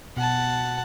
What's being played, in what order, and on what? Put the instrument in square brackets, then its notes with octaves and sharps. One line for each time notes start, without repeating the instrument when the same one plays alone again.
[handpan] B2 [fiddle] F#5 A5